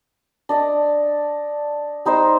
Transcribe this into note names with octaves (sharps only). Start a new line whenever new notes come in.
D4 D5 D#5
G3 D#4 C5 C6